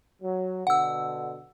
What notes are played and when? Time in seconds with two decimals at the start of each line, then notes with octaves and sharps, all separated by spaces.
0.22 F#3
0.67 B2 D3 F#5 E6